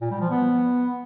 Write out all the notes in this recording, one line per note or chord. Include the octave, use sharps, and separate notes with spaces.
A#2
G3
F3
B3